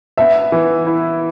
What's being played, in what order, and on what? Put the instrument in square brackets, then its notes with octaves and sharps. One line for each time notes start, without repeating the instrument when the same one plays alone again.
[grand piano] B3 [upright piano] E5
[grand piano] E3
E4